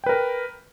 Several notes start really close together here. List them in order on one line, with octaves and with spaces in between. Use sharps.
G5 B4 A#4